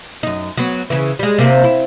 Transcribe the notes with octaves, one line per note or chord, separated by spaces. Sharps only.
F#2 D#4
F#3 B3
C#3 E3
G3 G#3
C3 A#3
E4